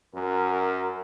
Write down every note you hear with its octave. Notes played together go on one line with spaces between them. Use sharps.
F#2 A#4